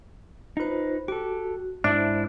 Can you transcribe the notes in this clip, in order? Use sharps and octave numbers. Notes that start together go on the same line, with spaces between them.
D#4 F4 B4 C5
F#4 G4 A4
G#2 D4 E4 C5 E5 A5